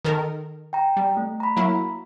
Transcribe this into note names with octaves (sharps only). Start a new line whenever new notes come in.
D#3 A4 A#4
G5 A#5
G3
A3
A#5 B5
F#3 A#3 E4